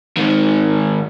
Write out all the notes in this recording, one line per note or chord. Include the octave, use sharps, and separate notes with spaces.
G#2 D#3